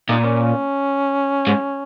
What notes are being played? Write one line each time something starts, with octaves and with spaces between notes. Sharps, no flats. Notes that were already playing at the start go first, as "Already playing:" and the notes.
A#2 D#4
A#3
C#4
G#2